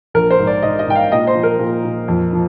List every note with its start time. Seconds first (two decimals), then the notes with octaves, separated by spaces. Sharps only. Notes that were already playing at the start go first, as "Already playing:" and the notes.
0.14 A#1 A#4
0.30 C5
0.39 G#2
0.47 D5
0.63 G#2 D#5
0.79 D#5
0.87 G#2 G5
0.95 F5
1.12 A#2 D#5
1.27 C5
1.35 F3
1.43 A#4
1.59 A#2
1.84 A#2
2.08 F2
2.33 F3